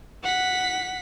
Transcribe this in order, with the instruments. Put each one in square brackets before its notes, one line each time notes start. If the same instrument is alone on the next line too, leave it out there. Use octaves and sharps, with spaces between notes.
[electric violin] F#5 B6